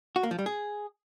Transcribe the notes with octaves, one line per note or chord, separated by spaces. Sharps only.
F#4
A#3
F3
G3
G#4